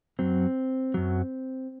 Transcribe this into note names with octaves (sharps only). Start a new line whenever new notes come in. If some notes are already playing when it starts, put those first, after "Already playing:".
F#2 F#3 C4
F#2 F#3